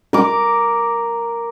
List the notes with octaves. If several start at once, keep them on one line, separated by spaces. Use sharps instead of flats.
A#4 D6